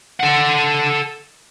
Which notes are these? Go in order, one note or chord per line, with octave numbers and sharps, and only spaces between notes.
A4 F#5